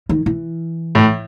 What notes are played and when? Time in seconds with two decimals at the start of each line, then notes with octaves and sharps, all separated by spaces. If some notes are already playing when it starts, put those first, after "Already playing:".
0.09 D#3
0.26 E3
0.95 A2